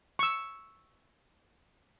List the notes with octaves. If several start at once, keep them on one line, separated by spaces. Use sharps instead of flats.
C#6 E6